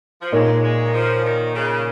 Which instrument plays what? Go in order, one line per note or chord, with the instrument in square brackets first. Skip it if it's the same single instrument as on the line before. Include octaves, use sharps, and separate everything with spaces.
[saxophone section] F3
[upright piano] A#2 A#3 D#4 C#5 [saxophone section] G#3
[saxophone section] G#3
D#3
F3
D#3
C#3